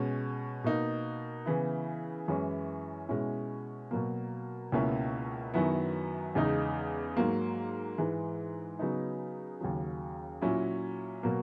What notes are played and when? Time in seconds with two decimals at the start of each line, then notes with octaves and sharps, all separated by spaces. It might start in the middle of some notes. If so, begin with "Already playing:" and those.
Already playing: B2 G#3 C#4
0.64 B2 A#3 D#4
1.46 C#3 E3 B3 E4
2.28 F#2 E3 G#3 C#4 E4
3.09 B2 G#3 C#4 E4
3.91 B2 F#3 A#3
4.72 C#2 B2 A#3 C#4 E4
5.54 F#2 D#3 F#3 B3 E4
6.35 E2 C#3 G#3 D#4
7.17 G#2 F#3 A#3
7.98 G#2 E3 G#3
8.79 C#3 F#3 B3 D#4
9.61 D#2 C#3 F#3
10.41 A#2 F#3 C#4 E4
11.23 B2 F#3 A#3